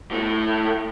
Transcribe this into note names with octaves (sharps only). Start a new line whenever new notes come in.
A2 A3